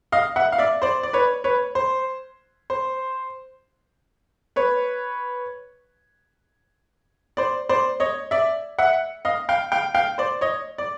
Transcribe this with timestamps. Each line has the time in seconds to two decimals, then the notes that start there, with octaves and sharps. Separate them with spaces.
0.12 D#5 F5
0.36 E5 F#5
0.52 F5
0.59 D5 E5
0.82 C5 D5
1.03 D5
1.13 B4 C#5
1.44 B4 C#5
1.75 C5
2.70 C5
4.56 B4 C#5
7.37 C5 D5
7.69 C5 D5
8.00 C#5 D#5
8.31 D5 E5
8.79 E5 F#5
9.25 D#5 F5
9.49 F5 G5
9.72 F5 G5
9.95 F5 G5
10.18 C5 D5
10.41 C#5 D#5
10.78 D5